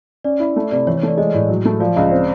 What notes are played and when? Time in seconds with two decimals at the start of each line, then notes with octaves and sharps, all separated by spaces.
0.24 C#4 D5
0.40 E4
0.56 A3
0.71 C3 D5
0.87 E3 C#5
0.97 C#5
1.03 A3 D5
1.17 G#3 C#5 D#5
1.33 A2 D5
1.49 F#3
1.65 A3
1.80 F3 D5
1.96 C#2 D#5
2.09 C4 D5